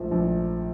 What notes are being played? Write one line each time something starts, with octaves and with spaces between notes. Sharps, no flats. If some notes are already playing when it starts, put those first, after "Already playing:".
Already playing: A#1 G#2 F3 A3
A#1